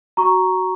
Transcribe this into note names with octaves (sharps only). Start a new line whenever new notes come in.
F#4 A#5 C#6